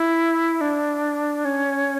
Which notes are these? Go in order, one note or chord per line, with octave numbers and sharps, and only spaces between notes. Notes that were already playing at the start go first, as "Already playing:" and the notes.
Already playing: E4
D4
C#4